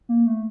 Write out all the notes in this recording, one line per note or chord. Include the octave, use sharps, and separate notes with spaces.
A#3
A3